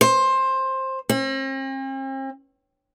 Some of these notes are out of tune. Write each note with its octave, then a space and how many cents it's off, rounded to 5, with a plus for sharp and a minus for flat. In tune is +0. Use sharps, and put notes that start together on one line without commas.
C5 +15
C4 +45